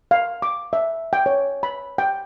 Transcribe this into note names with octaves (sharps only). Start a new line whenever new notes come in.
F5
D6
E5
G5
C#5
B5
G5